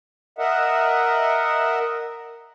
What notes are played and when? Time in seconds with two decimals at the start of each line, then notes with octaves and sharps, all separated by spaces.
0.38 A#4 D#5 E5 F#5